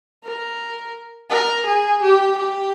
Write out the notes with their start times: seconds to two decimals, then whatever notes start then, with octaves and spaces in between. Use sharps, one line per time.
0.24 A#4
1.30 A#4
1.66 G#4
2.02 G4
2.38 G4